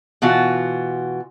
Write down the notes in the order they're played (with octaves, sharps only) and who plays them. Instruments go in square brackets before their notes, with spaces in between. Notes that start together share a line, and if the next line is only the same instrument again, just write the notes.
[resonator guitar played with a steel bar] B2 E3 F4 F#4